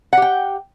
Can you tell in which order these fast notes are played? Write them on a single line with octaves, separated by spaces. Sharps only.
F#5 G4 G5